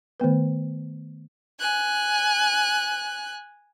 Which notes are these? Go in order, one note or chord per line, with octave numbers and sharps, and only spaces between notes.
D#3 A3 B3 B4
G#5 F#6